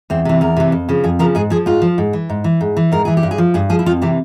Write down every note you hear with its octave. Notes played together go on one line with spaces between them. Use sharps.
E2 C4
C3 E3
E2 A#4
C3 E3
F2
C#3 F3
F2 G#4
C#3 F3 A#4
G#2 G#4
F3 G#4
G#2 F4
F3
G#2
E3
G#2
E3
G#2
E3
G#2 A#4
E3 G#4
G4
G2
G#4
F3
G2 G#4
F3 G#4
E4
F2 F4
C3 E3 G4